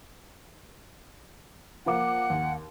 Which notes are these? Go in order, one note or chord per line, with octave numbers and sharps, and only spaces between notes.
F3 A#3 F#5 D6
D#2